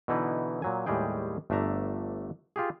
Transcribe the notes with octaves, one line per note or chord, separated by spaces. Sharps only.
B2 D3 E3 D#4 E4 B4
A#2 F#3 G#5
D#2 A2 G3 G#3 G#4 G5
G1 A3 D4 E5 A#5
F4 G4 G#4